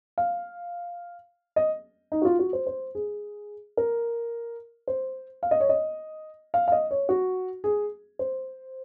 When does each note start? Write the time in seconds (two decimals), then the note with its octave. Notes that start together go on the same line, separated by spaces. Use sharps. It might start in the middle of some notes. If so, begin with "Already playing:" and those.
0.18 F5
1.56 D#5
2.12 D#4
2.22 F#4
2.25 F4
2.39 F#4
2.53 C5
2.67 C5
2.95 G#4
3.77 A#4
4.88 C5
5.43 F5
5.51 D#5
5.60 C#5
5.69 D#5
6.54 F5
6.68 F5
6.72 D#5
6.91 C#5
7.09 F#4
7.64 G#4
8.19 C5